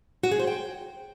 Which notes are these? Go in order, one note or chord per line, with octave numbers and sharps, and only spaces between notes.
F#4
G#4
C5
G5